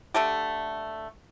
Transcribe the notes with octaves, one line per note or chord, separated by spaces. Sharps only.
D3 A3 G4